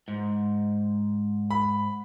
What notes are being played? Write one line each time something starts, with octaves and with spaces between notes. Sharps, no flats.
G#2
B5